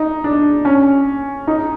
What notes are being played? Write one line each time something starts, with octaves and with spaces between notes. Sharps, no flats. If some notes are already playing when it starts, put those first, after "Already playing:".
Already playing: D#4
D4
C#4
D#4